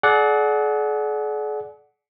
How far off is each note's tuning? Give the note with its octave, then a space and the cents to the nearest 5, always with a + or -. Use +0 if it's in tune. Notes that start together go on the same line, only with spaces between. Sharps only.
G#4 +45 D5 +0 F#5 +0